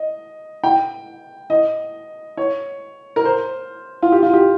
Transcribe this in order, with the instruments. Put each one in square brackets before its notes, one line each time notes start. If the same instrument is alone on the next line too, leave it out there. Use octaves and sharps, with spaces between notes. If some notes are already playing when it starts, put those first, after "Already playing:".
Already playing: [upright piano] D#5
G5
D#5
C#5
A#4
C5
F4
G4
F4
G4